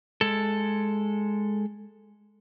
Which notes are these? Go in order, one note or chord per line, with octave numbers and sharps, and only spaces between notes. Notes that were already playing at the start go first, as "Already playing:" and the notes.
G#3 A4